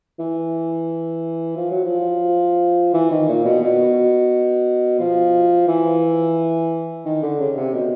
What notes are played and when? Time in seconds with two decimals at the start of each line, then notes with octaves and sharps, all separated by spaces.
0.19 E3
1.56 F3
1.70 F#3
1.84 F3
2.94 E3
3.11 D#3
3.29 A#2
3.45 B2
3.62 B2
5.00 F3
5.68 E3
7.05 D#3
7.22 D3
7.40 C#3
7.56 C3
7.74 B2